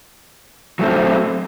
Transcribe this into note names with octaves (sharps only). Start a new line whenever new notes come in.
F#3 A3 C4